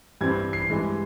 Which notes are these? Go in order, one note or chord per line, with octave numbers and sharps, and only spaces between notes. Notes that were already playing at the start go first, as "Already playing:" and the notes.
G2 E3 G3 C4 G#6
C7
G2 E3 G#3